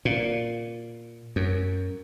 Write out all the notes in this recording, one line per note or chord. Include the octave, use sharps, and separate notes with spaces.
A#2
F#2